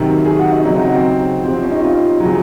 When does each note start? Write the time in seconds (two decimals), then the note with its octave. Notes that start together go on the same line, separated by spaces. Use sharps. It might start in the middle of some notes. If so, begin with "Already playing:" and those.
Already playing: C3 D#3 F#3
0.25 G#4
0.39 F#4
0.52 D#4
0.65 C#3 F#3 D#4
0.75 C4
0.84 F#4
0.94 C4
1.42 C3 F3 C4
1.53 C4
1.62 C#4
1.71 D#4
1.81 F4
2.20 C#3 F#3